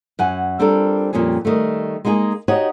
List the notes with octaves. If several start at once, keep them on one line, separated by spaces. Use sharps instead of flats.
F#2 F#5 G#5
G3 C4 D4 F4 A4 A#4
F2 A#2 G3 C#4 G#4
D#3 G3 A3
G#3 A#3 D#4 G4 G#4
D#4 F#4 G4 C#5 D#5 F#5